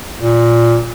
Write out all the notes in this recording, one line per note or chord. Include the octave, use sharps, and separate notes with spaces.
A#2